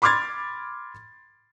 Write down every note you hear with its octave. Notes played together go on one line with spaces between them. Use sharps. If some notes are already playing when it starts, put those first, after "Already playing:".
B5 C6 D6 F6 G#6 A6